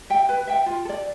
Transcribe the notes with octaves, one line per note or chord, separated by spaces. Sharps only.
E5 G5
B4
E5 G5
F4
A4
D5